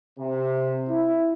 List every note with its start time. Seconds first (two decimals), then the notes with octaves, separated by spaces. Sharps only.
0.19 C3
0.88 E4